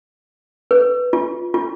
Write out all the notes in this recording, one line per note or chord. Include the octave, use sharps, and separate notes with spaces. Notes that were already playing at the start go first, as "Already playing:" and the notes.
B4
F4
F4